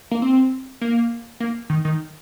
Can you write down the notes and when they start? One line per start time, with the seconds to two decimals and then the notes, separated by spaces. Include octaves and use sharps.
0.11 A#3
0.22 C4
0.81 A#3
1.40 A#3
1.70 D#3
1.85 D#3